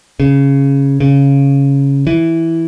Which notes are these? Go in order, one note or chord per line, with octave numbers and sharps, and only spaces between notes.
C#3
C#3
E3